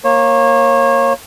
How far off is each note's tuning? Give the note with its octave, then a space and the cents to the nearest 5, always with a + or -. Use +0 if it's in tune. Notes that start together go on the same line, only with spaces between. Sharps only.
A#3 +0 C#5 -30